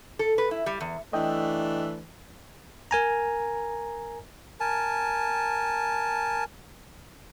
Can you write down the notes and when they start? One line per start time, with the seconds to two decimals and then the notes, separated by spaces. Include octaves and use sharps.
0.19 A4
0.38 B4
0.51 E4
0.66 G3
0.81 E2
1.13 E3 A3 D4 D#5 G5
2.91 A#4 G#5 A#5
4.60 A#4 G#5 A5